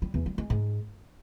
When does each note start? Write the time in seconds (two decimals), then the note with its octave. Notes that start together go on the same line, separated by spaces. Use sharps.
0.02 G3
0.14 E2
0.26 G3
0.38 G#3
0.50 G#2